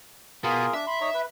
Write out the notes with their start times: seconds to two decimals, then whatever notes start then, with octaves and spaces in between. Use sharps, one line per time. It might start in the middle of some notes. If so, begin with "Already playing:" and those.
0.44 B2 F4 G#4 A#4
0.74 D4 E5
0.87 B5 C6
1.01 D#4 C#5 A#5
1.14 B4